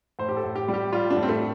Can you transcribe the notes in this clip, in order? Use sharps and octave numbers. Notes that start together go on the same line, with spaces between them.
A2 C5
G4
A4
A2
G4
G3
G4
G3 F4
D4
A2
C4
A3